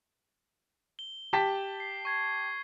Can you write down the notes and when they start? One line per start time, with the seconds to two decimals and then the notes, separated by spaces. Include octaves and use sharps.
0.99 G7
1.33 G4 A5 B6
1.80 C7
2.05 C#6 G#6 C7